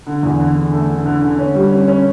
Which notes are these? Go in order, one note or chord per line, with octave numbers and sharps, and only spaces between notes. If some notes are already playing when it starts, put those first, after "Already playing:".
D3
E2
D3
D3
A3
D3
D3
D3
C#4
G3
C#4
C#4